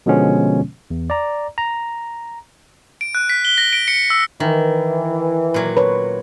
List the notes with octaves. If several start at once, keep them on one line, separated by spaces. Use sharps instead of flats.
B2 D3 F3 G#3 B3 C#4
E2
D5 A#5
A#5
D7
F#6
B6
G7
A#6
D7
C#7
E6
D#3 E3
A#2 F#3
B4 C#5